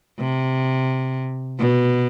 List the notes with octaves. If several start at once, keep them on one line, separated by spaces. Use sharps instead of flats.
C3
B2